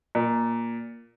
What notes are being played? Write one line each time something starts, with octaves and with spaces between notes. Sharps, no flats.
A#2